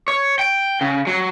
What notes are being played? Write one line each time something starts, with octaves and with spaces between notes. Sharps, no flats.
C#5
G5
C#3
F#3